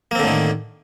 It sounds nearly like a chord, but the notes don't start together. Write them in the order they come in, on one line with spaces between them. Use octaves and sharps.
A#3 C4 D3 A2 D#3